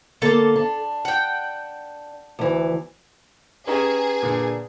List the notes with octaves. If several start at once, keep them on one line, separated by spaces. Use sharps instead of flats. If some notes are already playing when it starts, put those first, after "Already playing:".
D3 A#3 A4 A5
D4
F#5 G5
D2 E3
C#4 D#4 G4 G#4 B4 A#5
A#2 D3